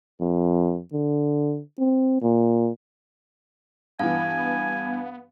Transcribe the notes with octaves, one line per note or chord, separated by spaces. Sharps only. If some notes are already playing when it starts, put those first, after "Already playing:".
F2
D3
C4
A#2
G2 E3 B3 F5 G#5